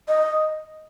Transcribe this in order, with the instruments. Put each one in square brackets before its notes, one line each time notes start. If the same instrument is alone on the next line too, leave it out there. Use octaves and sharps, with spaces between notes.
[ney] D#5